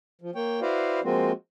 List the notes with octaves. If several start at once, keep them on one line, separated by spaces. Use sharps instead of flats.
F3
A#3 C#5 G5
E4 F#4 B4 C5 D5 F5
F3 G#3 A#3 C4 F4 F#4